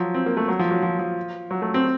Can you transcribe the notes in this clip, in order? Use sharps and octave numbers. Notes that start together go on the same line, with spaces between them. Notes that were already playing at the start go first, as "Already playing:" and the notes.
Already playing: F3 F#3
C4
A#3
A3
F#3
F3
F#3
F3
F3
F#3
A3
C4